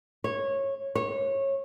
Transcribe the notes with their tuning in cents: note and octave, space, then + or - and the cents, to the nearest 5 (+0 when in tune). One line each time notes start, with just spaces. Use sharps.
C#5 -15
C#5 -20